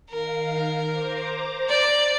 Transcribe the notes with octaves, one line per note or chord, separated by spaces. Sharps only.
D#3 A#4 F5
C5 A#5 D6
D5